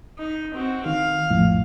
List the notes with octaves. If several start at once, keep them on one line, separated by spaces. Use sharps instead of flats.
D#4
C4 F#4
D#3 F5
A#1 F2 A2